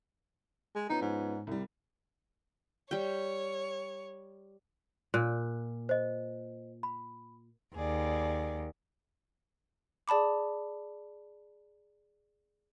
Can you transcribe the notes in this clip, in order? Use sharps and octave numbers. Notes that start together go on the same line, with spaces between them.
G#3
F3 B3 C#4 D#4
G#2
C2 G3
G3 C#5 G5
A#2 F#6
C5 D#5
B5
D#2 G#4 D5
G#4 D5 A5 B5 D6